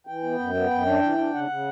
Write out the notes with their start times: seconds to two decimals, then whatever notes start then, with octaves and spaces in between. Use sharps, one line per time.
0.07 E3 G5
0.23 B3
0.39 F#2
0.55 B3
0.70 F#2
0.86 D4
1.02 E3
1.18 D4
1.34 C#3 F#5
1.49 C#3